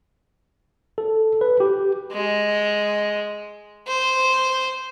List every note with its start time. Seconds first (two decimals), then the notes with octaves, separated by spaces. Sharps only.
0.98 A4
1.41 B4
1.60 G4
2.12 G#3
3.88 C5